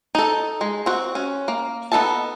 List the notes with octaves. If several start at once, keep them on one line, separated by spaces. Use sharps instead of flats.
D#4 A4
G#3
C4 F#4
C#4
A#3
B3 D#4 A4 E5 A5